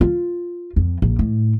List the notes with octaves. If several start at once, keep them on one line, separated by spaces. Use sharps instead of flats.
F4
F2
A#1
A2